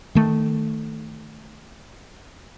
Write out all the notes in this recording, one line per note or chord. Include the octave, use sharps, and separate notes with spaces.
D#3 A3